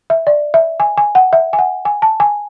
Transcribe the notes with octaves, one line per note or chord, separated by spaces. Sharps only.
E5
D5
E5
G#5
G#5
F#5
E5
G#5
F#5
G#5
A5
G#5